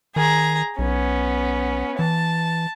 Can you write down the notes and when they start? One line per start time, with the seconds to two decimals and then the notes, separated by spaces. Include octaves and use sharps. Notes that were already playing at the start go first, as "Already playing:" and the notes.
0.16 D#3 G#4 A#5
0.79 B1 B3 C#4
1.99 E3 A5